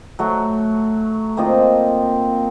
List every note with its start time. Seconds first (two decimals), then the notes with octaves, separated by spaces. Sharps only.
0.19 F#3 A3
1.37 A#3 C4 F4 D#5